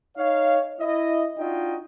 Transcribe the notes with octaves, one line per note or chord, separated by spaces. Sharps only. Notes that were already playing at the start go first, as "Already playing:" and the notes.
D#4 C#5 F5
E4 D#5
D4 D#4 F4 F#4 D#5 G5